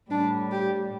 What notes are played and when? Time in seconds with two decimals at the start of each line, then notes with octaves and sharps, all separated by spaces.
0.11 A2 G3 D4
0.51 G4